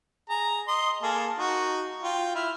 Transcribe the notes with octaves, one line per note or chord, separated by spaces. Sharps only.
G#4 A#5
D#5 C6
A#3 G#4 A4
D#4 F#4
F4 G5
E4 F6